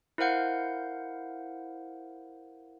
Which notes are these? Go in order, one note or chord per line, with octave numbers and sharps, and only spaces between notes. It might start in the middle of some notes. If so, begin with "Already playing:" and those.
E4 A#4 C5 F5 F#5 G6